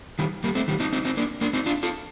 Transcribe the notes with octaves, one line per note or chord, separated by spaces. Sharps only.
D#3 G3
G3 A#3
A3 C4
D#3 G3
C4 D#4
C4 D#4
C4 D#4
A#3 D4
A#3 D4
C4 D#4
D4 F4
F4 A4